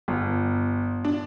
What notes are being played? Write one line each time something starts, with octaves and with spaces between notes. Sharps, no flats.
G1
D4